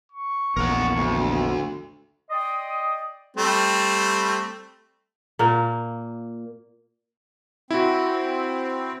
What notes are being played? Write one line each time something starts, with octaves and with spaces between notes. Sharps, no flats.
C#6
A#1 E2 A#4 F#5
D2
D5 D#5 G5 C6 D#6
G3 A3 C4
A#2 A#3
C4 E4 F#4